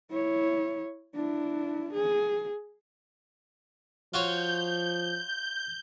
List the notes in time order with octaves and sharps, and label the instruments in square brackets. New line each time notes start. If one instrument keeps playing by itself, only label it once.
[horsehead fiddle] E4 C#5
D4 E4
G#4
[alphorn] F3 [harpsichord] F4 F#4 C#5 [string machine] G6